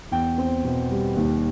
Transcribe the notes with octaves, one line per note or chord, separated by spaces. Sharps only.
E2 G5
C4
B2
G3
D#2